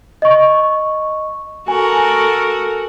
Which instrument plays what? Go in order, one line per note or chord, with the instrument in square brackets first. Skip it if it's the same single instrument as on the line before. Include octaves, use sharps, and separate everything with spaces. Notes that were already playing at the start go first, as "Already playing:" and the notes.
[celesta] D#5 C#6
[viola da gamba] F#4 A4 A#4 [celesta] G#5